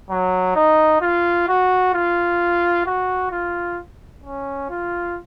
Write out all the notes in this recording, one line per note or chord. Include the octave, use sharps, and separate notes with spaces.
F#3
D#4
F4
F#4
F4
F#4
F4
C#4
F4